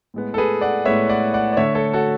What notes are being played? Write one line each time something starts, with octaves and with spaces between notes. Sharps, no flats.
A2 G#3 B3
A4
G#4 B4
D5 F#5
A2 G#3 B3 C#5 E5
D5 F#5
D5 F#5
D5
D3 A3 C#5 E5
A4 C#5
F#4 A4